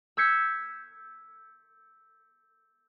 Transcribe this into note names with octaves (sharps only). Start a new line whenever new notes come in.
E6 G6 G#6 B6 C#7